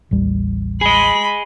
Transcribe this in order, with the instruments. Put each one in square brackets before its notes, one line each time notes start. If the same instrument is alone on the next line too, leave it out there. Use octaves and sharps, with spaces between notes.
[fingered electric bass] A1 D#2 G3
[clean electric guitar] G#4 D#5 [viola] B5